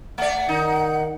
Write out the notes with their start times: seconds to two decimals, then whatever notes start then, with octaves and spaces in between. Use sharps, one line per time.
0.18 A3 D5 F#5
0.49 D#3 D#4